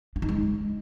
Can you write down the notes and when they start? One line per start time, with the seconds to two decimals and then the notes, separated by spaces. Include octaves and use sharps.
0.16 D4
0.22 D#4
0.29 G#3